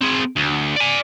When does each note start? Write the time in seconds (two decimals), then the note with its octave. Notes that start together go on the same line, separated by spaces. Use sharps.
0.01 C4 G#4
0.36 D2
0.76 D5 G#5